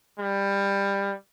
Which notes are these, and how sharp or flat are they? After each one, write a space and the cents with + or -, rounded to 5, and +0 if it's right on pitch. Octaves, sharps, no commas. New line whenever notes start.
G3 +20